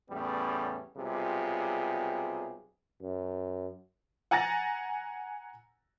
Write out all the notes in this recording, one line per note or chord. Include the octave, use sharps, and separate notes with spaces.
E2 A2 G3 B3 C#4
B1 C3 G3 F4 G#4
F#2
F#5 G#5 A#5 A6 A#6